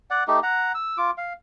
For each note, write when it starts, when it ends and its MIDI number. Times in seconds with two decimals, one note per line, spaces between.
0.10 0.24 74
0.10 0.24 78
0.28 0.40 57
0.28 0.40 63
0.28 0.40 67
0.43 0.72 78
0.43 0.72 82
0.75 0.97 88
0.97 1.11 65
0.97 1.11 86
1.18 1.33 77